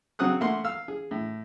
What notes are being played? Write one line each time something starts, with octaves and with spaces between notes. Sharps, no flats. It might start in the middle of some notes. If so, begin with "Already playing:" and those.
C#3 F#3 C4 F#5 D#6 F#6
A3 A#3 F#5 C6
F5 E6 F6
G#4
A2